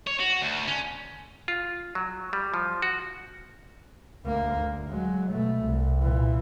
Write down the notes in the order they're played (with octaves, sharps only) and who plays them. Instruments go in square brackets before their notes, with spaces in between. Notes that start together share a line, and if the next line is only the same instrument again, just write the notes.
[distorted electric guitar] C#5
F#4
D2
C#4
[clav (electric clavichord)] F4
F#3
G3
F3
F#4
[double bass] D2 A#3
D2
F#3 G#3
B2 A3
C2
A#2 E3